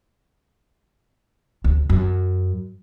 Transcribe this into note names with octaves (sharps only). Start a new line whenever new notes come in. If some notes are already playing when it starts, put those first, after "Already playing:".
D2
F#2